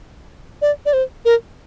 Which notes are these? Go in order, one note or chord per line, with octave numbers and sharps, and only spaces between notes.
D5
D5
C5
A#4